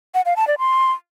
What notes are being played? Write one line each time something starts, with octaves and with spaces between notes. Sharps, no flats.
F#5
F5
A5
D5
C6